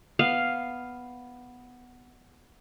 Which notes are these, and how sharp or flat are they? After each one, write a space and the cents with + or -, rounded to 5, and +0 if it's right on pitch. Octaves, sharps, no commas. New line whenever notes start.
B3 +0 F5 +0